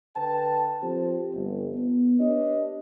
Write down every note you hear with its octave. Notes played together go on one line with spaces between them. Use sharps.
D3 B4 G5 A5
F3 C4 G4 A4 C5
G1
B3
D4 G4 B4 C#5 D#5